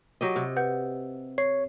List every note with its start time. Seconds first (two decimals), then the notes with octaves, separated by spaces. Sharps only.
0.21 F#3 G4 D#5
0.36 C3
0.56 B4 F#5 G6
1.38 C#5 C7